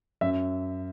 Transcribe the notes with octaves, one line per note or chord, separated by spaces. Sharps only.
F#2 E5